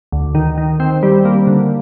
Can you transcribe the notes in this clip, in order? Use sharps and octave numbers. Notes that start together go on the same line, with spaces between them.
D2
D#3
D#3
C4
G3
A#3
D3